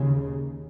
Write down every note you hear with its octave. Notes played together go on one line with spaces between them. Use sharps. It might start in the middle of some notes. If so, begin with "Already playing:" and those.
Already playing: D#2 C#3